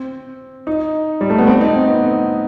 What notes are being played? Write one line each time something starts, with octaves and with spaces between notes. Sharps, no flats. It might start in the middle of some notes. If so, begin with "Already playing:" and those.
Already playing: C4
D#4
G3
A3
B3
C4
D#4
C4
B3